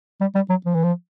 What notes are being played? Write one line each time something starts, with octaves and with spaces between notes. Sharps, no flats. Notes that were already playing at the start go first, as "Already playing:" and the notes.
G3
G3
F#3
F3
E3
F3